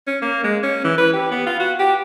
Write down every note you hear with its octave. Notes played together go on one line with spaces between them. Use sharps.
C#4
A#3
G#3
C#4
E3
B4
G4
B3
F4
F#4
G4